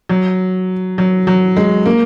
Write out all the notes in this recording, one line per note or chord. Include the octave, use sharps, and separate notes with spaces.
F#3
F#3
F#3
G#3
A#3